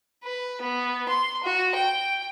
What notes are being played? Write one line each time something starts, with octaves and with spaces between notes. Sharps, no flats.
B4
B3
C6
F#4
G5